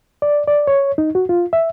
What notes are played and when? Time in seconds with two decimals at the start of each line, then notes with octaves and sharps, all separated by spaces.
0.22 D5
0.48 D5
0.67 C#5
0.98 D#4
1.15 F#4
1.29 F4
1.53 E5